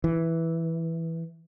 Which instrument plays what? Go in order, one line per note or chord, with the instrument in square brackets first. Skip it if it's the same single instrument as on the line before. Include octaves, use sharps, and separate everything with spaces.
[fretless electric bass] E3